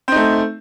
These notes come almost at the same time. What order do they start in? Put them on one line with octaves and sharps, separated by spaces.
C4 D#4 A3